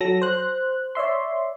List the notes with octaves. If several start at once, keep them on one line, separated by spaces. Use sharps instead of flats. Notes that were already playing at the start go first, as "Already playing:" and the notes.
F#3 A4 A#6
C5 F#6
C#5 D5 E5 C6